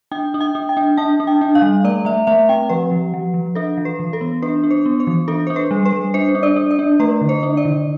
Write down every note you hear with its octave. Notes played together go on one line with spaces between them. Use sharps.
D4 G5
D4
G5
D4
G5
D4
D4 A5
D4
G5
D4
F5
G3
A3 D5
A3 E5
A3 E5
C4 G5
F3 B4
F3
F3
F3
D4 A4
E3
B4
E3
A4
B3
D4 B4
D4
C5
B3
C5
E3
D4 A4
D4 C5
B4
G3
B4
G3
D4 C5
D4
D5
D4
D5
D4
A3 B4
D3
C5
D4
D5
D3